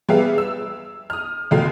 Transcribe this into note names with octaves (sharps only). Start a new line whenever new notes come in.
G3 B3 G#4 B4 E5 F5
E6
D#6 F6
F#1 D2 B2 D3 F5